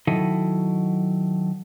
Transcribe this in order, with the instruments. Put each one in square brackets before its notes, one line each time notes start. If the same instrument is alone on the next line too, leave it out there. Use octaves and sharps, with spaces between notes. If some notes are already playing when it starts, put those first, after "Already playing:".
[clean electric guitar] D#3 F#3 E4 A4 D#5